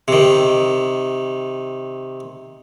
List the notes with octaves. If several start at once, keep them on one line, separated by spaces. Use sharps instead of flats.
C3 D#3